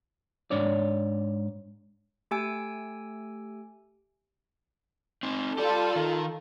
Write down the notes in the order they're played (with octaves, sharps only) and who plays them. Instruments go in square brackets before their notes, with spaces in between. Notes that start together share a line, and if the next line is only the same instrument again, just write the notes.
[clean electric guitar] G#2 D4 C#5 D5
[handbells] A3 G4 G#5 E6 D7
[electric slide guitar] C4 D#4
[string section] F4 A4 [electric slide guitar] G4 D5
[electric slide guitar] D#3 D#4 A#4